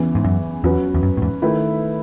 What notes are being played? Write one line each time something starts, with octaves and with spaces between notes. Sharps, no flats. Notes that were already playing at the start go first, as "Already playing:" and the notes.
Already playing: E2 C#3 E3
G#2
F#2
E2 F#3 C#4 F#4 B4
E2
F#2
A2
E2 G#2
D#3 A3 E4 B4